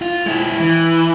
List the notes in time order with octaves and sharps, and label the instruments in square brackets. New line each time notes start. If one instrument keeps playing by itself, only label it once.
[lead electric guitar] F4
G#3 E4
E3